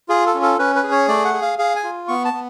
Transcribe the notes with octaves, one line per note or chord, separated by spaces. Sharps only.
F4 G#4
A4
C#4
A4
C#4 B4
B4
G#4
C#5
A3 D5
F#5
G#4
F5
G#4 F5
G#5
F4
B3 C#6
A5
B3